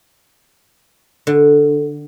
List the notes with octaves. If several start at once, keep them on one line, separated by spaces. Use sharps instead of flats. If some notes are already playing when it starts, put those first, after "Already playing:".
D3